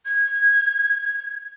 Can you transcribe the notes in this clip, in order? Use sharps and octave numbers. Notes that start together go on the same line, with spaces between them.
G#6